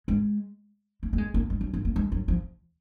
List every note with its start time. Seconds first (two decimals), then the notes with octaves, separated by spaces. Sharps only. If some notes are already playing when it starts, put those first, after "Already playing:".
0.08 G#3
1.03 A#3
1.13 A#3
1.18 G#3
1.34 A#3
1.50 G#3
1.61 F#3
1.73 F3
1.85 A#3
1.96 G#3
2.12 F#3
2.28 F3